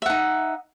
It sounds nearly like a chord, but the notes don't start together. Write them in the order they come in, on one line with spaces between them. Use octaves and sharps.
E5 F#5 D#4